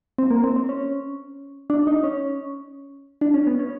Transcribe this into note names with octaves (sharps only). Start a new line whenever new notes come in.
C4
A#3
C4
C4
C#4
D4
D#4
C#4
D4
C#4
B3
C#4